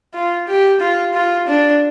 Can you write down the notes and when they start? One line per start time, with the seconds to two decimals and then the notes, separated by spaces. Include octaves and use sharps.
0.14 F4
0.48 G4
0.81 F4
1.14 F4
1.47 D4